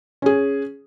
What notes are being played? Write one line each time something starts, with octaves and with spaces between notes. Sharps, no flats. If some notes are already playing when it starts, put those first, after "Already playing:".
C#4 G#4